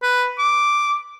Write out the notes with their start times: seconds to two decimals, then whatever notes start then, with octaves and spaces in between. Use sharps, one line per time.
0.03 B4
0.39 D6